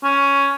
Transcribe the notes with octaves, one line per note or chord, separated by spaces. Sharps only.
C#4